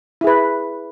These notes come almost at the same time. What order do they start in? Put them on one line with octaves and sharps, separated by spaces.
E4 G#4 B4